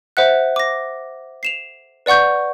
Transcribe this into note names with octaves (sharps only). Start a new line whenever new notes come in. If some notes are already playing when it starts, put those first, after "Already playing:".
C5 E5 F#5 F#6
D6 A#6
C7 E7 F7
B4 D5 F#5 C#6 G6